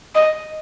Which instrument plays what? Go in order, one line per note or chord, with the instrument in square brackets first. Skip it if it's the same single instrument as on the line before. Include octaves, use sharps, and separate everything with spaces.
[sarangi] D#5